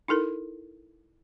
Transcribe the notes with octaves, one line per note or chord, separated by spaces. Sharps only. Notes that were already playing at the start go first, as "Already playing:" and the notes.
D#4 E4 A4 A#4